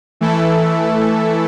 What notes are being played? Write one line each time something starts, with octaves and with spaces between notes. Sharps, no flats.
E3 A3 E4 A4